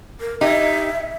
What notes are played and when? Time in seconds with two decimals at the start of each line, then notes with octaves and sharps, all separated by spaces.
0.20 A#4
0.41 D#4 G4 E5